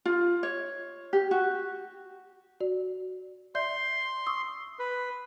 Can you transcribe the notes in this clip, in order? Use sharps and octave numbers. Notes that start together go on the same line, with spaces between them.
F4
C#5
G4
F#4
F#4 D5
D5 E5 C6 G6
C#6 D#6 E6
B4